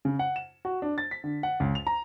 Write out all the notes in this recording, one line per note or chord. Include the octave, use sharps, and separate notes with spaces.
C#3
F#5
E7
F#4
D4
A6
B6
D3
F#5
C#2
F7
A#5